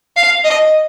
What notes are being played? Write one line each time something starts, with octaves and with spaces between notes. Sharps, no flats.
F5
D#5